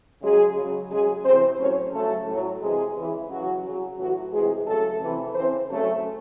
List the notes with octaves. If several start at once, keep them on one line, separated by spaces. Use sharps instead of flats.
C#3 F#3 G#3 G#4
C#3
F#3
C#3 F#3 G#3 G#4
C3 E3 C4 C5
A2 F#3 C#4 C#5
C#3 F#3 A3 A4
A2 F#3
C3 E3 G#3 G#4
C#3 E3
C#3 E3 F#3 F#4
C#3 F#3
A2 E3 F#3 F#4
C3 E3 G#3 G#4
C#3 F#3 A3 A4
C3 E3
C#3 E3 C4 C5
C#3 F#3 A3 A4